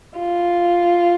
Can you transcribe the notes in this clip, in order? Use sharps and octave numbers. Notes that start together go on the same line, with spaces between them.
F4